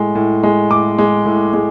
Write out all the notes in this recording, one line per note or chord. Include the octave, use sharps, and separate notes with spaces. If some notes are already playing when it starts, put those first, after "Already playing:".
Already playing: A2 G#3
A2
G#3
A2 D6
G#3
A2
G#3